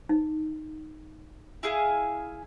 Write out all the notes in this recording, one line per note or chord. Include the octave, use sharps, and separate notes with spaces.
D#4
E4 G#4 F5